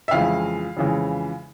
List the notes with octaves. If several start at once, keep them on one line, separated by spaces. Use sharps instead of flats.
E5
F2 C#3 E3 G#3 F5
F2 C#3 E3 G#3